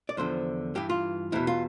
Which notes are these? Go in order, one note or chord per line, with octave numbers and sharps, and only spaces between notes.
D5
E2 D3 F3 C5
G2 E3 G4
F4
E2 B2 E4
F4